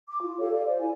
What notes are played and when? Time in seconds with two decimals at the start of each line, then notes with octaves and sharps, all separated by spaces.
0.08 D6
0.22 E4 F4
0.39 G4 A4 C#5 F5
0.52 G4 D5 F5
0.66 C5 D5
0.80 E4 G#5